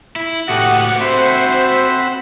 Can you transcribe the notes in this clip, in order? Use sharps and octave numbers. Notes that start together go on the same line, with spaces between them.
E4
A2 F#4 G4 A4 F#5 D#6
C4 C5 E5 F#5 B5 C6 E6